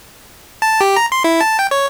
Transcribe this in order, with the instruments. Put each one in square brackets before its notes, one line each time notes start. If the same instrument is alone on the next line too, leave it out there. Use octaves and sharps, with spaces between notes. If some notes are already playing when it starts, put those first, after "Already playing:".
[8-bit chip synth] A5
G4
A#5
C6
E4
A5
G5
C#5